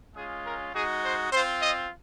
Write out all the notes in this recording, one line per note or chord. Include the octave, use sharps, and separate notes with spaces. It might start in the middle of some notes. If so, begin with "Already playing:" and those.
G#3 C#4 F4 G#4
A#4
G#3 D#4 F#4 G#4
C5
C4 F4 C5
D#5